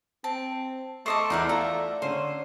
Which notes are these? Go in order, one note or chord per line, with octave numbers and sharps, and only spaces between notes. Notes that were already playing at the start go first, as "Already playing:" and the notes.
C4 A5
A3 C5 D#5 A5 C#6 D6 E6
E2 D#4 E4 A#4 B4 D5 D6
F4 A4 A#5
D3 C#4 C5